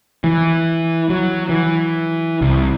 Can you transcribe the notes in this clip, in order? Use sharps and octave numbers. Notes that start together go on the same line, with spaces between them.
E3
F#3
E3
C2